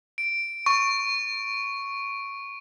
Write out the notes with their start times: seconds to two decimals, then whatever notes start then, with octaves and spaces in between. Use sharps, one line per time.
0.18 D7
0.66 C#6